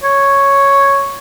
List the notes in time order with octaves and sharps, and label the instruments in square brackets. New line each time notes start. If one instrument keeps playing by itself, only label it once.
[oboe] C#5